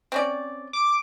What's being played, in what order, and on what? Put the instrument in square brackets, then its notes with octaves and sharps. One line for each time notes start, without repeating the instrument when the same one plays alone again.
[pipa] C4 C#4 D5
[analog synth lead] D6